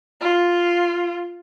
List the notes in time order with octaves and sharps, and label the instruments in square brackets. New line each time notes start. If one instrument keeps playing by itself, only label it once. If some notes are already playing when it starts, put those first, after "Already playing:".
[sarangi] F4